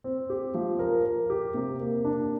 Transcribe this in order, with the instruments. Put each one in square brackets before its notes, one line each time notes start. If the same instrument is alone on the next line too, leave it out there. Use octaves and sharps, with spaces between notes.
[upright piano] C4
G4
F3
A#4
A#4
G4
C3
A#3
D4